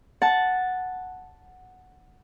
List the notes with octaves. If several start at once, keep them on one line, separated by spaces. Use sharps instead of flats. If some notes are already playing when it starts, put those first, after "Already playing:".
F#5 A5